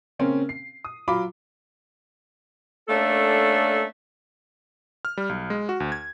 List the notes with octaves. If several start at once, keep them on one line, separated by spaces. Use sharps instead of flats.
C#3 A#3 C4 C#4
C7
D#6
F#3 F4 B5 D6
A3 A#3 C#4 D4 A4
F6
G3
B1
G#3
F#4
D2
G#6